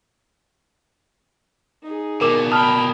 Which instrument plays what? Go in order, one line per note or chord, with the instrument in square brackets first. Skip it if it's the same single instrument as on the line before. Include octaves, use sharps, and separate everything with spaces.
[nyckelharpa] D#4 G#4
[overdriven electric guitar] B2 A#3 [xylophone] A#4 D6
[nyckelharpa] G5 B5 [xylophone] A5 [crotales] D#6 F6